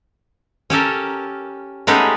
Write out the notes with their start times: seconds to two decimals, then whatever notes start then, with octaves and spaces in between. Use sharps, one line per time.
0.70 C#4 G4 A4 A#4
1.87 G#3 A3 B3 C#4 D#4 G4